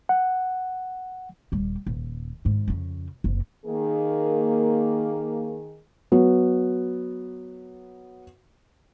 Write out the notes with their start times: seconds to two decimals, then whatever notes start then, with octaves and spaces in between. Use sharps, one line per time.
0.09 F#5
1.52 D#1 G3
1.87 D#1
2.45 G#1 G#2
2.68 F2 C#3
3.24 F#1 F2
3.66 D#3 A#3 G#4
6.12 F#3 B3